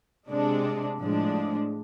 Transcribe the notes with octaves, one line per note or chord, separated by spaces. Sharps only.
C3 G#3 D4
A2 F3 G#3 D4